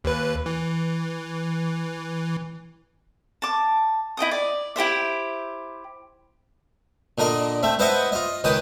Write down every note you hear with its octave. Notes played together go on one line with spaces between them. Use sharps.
D#2 B4
E3
A5 D6
E4 D#5 G5 D#6
D5
E4 G4 C5 E5
A#2 D3 A#4 D#5
A3 C4 E5
E4 B4 C5 D#5 E5 F#5
F4 D#5
C#2 D#3 B4 G5 D#6